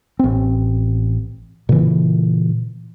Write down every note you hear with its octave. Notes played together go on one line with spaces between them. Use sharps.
A1 C4
A#2 C#3 E3